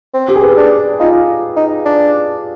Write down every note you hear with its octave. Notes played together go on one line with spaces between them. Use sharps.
C4
G4
G#4
B4
D4
D#4 F4
D#4
D4